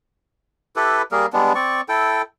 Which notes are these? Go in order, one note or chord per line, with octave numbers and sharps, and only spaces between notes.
E4 G4 A4 B4
G3 A#3 G#4 A#4
G3 G#3 B3 D4
C4 D5 C#6
E4 A4 G5